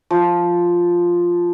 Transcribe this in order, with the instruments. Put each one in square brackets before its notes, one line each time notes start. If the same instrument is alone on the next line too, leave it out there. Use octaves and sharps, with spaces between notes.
[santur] F3